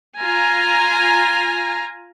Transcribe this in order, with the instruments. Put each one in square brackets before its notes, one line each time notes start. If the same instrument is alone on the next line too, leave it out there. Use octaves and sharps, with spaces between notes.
[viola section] F4 G#5 A#5